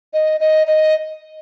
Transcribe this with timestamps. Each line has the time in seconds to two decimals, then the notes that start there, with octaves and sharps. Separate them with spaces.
0.13 D#5
0.40 D#5
0.67 D#5